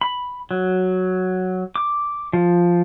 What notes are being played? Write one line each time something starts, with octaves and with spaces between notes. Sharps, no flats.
B5
F#3
D6
F3